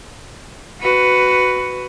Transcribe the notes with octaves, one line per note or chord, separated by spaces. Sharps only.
F#4 B4